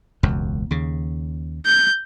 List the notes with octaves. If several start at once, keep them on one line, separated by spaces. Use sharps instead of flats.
E1 C#2 F#2
D#2 C#3
G6